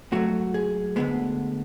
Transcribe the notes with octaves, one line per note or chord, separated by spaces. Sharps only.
G#2 F#3 A3 F#4
G#4
D2 D3 G#3 B3